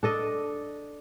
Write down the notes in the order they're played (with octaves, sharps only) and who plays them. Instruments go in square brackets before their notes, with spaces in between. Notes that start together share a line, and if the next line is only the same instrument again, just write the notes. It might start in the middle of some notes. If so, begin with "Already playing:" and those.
[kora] D4 A4 D#5